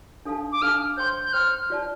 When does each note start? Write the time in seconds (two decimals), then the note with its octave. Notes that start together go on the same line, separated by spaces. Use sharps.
0.25 D4 A4 F5 A5
0.52 D6
0.62 D4 A4 F5 A5 F6
0.97 C5 G5 C6 G6
1.24 G6
1.33 C5 G5 C6 F6
1.70 F4 D5 A5